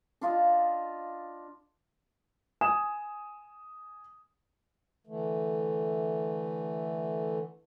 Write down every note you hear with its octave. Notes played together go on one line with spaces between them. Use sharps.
D4 F4 D#5
G#5 D#6 E7
D3 E3 A3